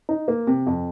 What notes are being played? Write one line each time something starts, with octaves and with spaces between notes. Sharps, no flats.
D#4
A#3
C3
F2